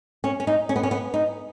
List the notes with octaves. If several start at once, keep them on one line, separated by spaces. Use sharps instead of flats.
C#4
C#4
D#4
C#4
B3
C#4
B3
D#4